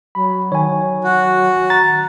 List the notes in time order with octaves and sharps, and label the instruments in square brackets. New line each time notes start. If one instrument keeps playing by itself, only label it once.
[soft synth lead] F#3 [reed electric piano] B5
[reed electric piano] D#3 [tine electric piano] C#5 G#5
[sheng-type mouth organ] F#4
[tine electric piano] A#5 A6